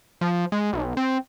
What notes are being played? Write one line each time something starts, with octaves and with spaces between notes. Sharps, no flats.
F3
G#3
B1
C4